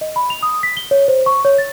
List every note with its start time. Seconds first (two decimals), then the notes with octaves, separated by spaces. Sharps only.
0.01 D#5
0.16 B5
0.30 F7
0.43 D#6
0.63 B6
0.77 G7
0.91 C#5
1.08 C5
1.26 C#6
1.45 C#5
1.58 A6